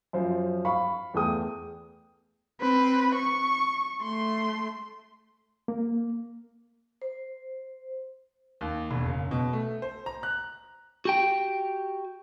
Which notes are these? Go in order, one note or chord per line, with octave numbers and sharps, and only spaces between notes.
F#2 F3 C5
F5 B5 C#6
E2 A3 G#4 G5 D#6
C4 B4
C#6
A3 C6
A#3
C5
D#2
E1
F#1
B2
A3
C5
A#5
F#6
F#4 G4 G5